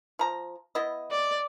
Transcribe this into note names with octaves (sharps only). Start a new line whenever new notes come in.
F3 A#5
B3 E4 D#5
D5